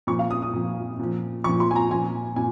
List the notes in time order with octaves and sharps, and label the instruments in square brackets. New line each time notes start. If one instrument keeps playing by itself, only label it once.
[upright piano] A#2 F3 C#6
F5
D#6
D#6
A#2 F3
A#2 F3
A#2 F3 C#6
C6
G#5
A#5
A#2 F3 G#5
A#2 G#5